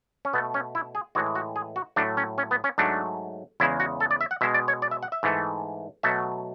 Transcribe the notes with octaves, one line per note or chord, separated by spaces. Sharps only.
C#4
B2 A3 B3
C#4
E4
G#4
A2 E3 G#3 F#4
F#4
G#4
F#4
A2 F#3 A3 D4
C#4
C#4
B3
C#4
G#2 F#3 A3 D4
E2 C#3 G#3 E4
F#4
A4
D5
E5
F#5
B2 G#3 E5
D5
C#5
D5
E5
F#5
E5
G#2 E3 A3
B2 F#3 A3 E5